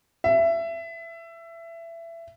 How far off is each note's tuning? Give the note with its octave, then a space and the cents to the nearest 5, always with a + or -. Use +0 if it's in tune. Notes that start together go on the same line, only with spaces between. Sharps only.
E5 +20